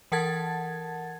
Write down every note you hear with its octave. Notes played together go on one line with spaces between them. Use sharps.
E3 A#4 F#5 A5 G#6 A6